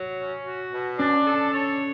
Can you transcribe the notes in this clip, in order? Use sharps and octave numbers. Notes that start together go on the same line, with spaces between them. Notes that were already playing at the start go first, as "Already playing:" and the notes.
Already playing: F#3
C#4
F#4
B2
C#4 D4
A4
C#5